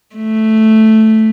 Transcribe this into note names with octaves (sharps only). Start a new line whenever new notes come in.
A3